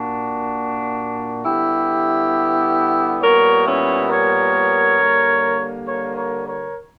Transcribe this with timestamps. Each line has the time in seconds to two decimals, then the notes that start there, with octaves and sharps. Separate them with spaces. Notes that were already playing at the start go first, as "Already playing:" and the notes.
Already playing: A#2 A#3 D4 F#4
1.44 D3 G3 B3 E4 G4
3.21 A#2 G3 B3 A#4 C#5
3.65 C#4 E4
4.09 A#4 C#5
4.98 D3 G3 A#3
5.87 A#4 C#5
6.16 A#4 C#5
6.46 A#4 C#5